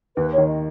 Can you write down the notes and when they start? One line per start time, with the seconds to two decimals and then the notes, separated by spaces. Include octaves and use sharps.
0.16 D#2 B4
0.32 C#5
0.38 D#3
0.48 D#5